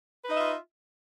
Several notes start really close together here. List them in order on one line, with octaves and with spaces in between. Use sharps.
B4 D#4 D#5 E5 F4